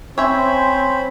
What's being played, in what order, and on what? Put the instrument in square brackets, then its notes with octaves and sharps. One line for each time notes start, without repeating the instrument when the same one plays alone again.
[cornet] C4 [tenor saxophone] C#4 [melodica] C5 B5 [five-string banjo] C#5 E5